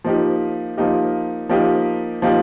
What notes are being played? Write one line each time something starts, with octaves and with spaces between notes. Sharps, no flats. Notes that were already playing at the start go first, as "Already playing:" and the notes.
F3 A#3 D#4 G4
F3 A#3 D#4 G4
F3 A#3 D#4 G4
F3 A#3 D#4 G4